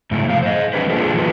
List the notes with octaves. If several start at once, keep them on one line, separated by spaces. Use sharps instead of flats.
G#2 C#3 A3 E4
C3 F3 A4 F5
C5 D#5
E3 G3 C4 D4 G4 B4
A#3 D4 F4 G#4 A4
E3 F#3 D#4 F4 F#4 B4